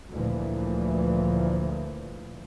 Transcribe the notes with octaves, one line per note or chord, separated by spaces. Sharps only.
D2 A#2 E3 F3